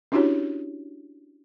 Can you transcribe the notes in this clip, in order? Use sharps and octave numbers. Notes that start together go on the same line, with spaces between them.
C#4 D4 E4 F#4 G4 C#5